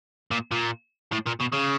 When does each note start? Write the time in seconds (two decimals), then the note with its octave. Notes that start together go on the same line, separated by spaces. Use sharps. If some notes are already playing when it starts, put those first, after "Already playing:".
0.31 A#2
0.51 A#2
1.12 A2
1.27 A#2
1.40 B2
1.53 C#3